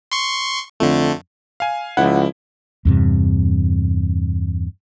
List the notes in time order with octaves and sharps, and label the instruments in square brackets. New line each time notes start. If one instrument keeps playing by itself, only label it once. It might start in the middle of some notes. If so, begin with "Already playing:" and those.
[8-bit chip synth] C6 C#6
[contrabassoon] F2 [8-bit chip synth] D3 A3
[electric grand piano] F5 G#5
[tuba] C#2 [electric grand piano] F3 E4 [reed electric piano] F#5
[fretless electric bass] E2 G2 C3